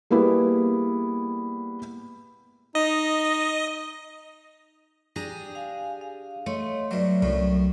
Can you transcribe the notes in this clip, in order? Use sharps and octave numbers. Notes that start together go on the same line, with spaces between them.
G3 A#3 B3 E4 G#4
D#4 D#5
D4 G4 G#4 A#5
F5 G#5
F5
A3 C#5 D#5 C6
G2 F#3 D5 E5
C2 F#2 A2